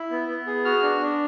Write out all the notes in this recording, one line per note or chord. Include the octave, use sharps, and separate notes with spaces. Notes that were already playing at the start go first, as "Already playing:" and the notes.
Already playing: E4
B3
B3
G#4
F#4 F6
D4
D4